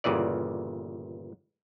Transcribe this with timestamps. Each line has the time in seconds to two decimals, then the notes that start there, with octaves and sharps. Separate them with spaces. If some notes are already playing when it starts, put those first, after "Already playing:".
0.04 G1 A#2 C#3 E3 D5